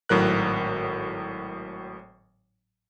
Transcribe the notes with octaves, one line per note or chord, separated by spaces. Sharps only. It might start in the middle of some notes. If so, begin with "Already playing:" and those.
G#1 A2 F#3 A#4 F#6